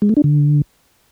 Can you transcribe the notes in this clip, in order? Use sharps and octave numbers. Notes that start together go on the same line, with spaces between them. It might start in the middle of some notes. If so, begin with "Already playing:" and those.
G#3
A3
D4
D3